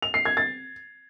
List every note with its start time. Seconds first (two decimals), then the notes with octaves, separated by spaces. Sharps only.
0.02 F7
0.14 C7
0.25 G#6
0.37 A6